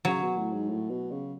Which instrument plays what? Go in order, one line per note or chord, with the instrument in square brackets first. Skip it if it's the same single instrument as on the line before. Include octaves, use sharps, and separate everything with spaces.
[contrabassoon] C#3 [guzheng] F#3
[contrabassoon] B2
A2
G#2
A2
B2
C#3